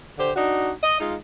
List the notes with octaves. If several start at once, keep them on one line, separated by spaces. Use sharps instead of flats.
D3 G4 C5
D4 D#4 F#4
D#5
G#3 D#4 F4